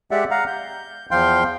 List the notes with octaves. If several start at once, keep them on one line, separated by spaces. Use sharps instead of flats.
G#3 G4 D5 E5 F#5
F5 F#5 A#5
G6
E2 F3 F5 G5 C6 G6